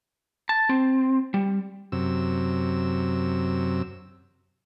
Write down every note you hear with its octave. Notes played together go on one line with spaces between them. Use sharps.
A5
C4
G3
F#2 C3 E6